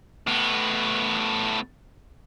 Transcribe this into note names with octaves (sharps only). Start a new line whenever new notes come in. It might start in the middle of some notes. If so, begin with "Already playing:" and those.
A2 B3